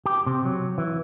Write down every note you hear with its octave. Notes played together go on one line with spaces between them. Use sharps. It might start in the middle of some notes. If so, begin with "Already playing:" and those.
G4
C3
F#3
E3